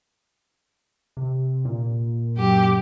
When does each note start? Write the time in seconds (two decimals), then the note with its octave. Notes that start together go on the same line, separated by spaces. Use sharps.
1.17 C3
1.65 A#2
2.37 F#2 G4